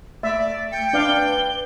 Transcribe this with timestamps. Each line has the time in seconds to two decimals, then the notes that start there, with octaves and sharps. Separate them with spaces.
0.23 A3 D5 E5 A6
0.72 G5 C#7
0.93 D4 B4 D5 F5 G7